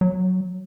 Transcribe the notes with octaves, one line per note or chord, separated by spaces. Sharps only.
F#3